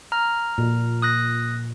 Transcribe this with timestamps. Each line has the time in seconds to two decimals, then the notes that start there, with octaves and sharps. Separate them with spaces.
0.12 A#5 F6
0.58 A#2
1.02 D#6 F#6 A#6